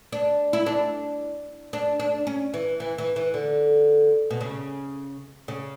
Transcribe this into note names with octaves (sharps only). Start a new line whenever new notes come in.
D4
E4
D4
D4
D4
C#4
E3
E3
E3
E3
D3
B2
C#3
C#3